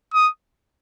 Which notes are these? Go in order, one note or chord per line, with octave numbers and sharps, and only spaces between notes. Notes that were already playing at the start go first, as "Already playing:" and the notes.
D#6